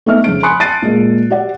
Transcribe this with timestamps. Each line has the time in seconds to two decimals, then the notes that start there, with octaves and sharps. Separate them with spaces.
0.06 A3 B3 D#4 E5 F6
0.24 F1 C#3 D7
0.43 G#5 B5 C6 D#6 F#6 C#7
0.60 A5 F#6 A6 C7 D7 D#7
0.82 A#2 G#3 A#3
1.30 F#4 G4 D5 F#5